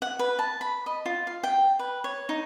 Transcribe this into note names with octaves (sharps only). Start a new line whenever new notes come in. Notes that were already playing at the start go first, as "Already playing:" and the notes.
F#5
B4
A5
B5
D#5
F4
F5
G5
B4
C#5
D#4